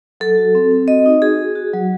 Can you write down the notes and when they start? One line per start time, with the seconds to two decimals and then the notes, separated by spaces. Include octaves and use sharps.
0.20 F#3 A4
0.38 F#4
0.55 C4
0.71 C4
0.88 F#4 D#5
1.06 D#4
1.22 F#4 G#4
1.39 F#4
1.56 F#4
1.74 F#3